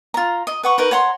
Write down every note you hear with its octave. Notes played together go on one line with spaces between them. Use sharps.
F4 A#5
D#5
B4 F#5 C#6
D#4 A#4 B4
C#5 F#5 A#5 C6